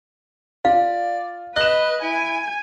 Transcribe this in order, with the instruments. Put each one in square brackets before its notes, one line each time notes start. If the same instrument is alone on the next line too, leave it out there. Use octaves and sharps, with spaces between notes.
[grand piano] F4 [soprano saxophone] D5 [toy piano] F5
[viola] B4 [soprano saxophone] D#5 [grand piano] F#6 E7
[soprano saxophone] E4 [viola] G#5